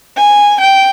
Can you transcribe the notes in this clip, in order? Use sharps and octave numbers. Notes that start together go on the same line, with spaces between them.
G#5
G5